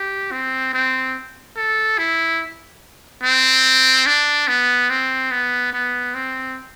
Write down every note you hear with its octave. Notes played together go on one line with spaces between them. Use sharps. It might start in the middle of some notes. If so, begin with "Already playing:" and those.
Already playing: G4
C4
C4
A4
E4
C4
D4
B3
C4
B3
B3
C4